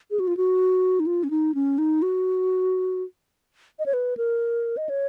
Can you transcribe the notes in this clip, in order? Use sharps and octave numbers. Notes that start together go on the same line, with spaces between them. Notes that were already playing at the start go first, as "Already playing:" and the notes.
G#4
F#4
F4
F#4
D#4
F4
C#4
D#4
C#4
D#4
F#4
D#5
C#5
B4
A#4
D#5
C#5